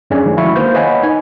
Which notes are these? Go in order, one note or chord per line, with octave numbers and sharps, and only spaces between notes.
F#2 C#4 D4 G#4 D5 G#5
D3 D#3 F3 G#3 A3
E4 F#4 E5 F5 B5 C#6
D#3 A#3 B4 C5 F5 G6
B4 C#5 D#5 F#5 G#5 B5
D#4 G#5